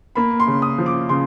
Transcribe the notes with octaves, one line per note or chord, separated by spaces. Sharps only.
A#3 B5
C6
C#3
D#6
F3
D6
C#3 C6